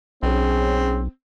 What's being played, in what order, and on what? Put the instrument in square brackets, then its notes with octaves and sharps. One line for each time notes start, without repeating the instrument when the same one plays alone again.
[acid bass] B1 [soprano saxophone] C4 [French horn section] C#4 G#4